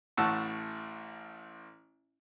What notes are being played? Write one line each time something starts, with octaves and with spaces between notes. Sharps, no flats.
A1 A2 F#5 A5 C#6 E6